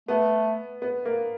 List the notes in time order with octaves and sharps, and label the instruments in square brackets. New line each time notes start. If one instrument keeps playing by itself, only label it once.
[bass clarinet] A3 [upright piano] B3
[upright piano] B3
A#3